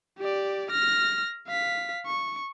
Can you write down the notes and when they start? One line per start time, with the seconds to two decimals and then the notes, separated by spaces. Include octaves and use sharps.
0.19 G4 D5
0.71 F6 A#6
1.47 F5 B6
2.06 C#6